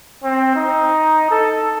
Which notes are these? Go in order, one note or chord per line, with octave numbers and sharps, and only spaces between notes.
C4
D#4
A4